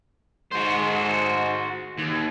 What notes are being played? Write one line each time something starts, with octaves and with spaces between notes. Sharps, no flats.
G#2 F#4 C5
D#2